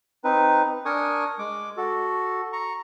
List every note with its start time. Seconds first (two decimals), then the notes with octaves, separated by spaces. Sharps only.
0.24 C4 D#4 B4
0.85 D4 A#4 G#5 C#6 D#6
1.39 G#3 D6
1.77 F#4 A4
2.53 A#5 C#6